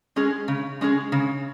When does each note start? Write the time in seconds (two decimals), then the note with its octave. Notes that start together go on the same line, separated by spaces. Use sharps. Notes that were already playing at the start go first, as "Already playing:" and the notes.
0.16 G#3 C#4 G#4
0.48 C#3
0.81 G#3 C#4 G#4
1.12 C#3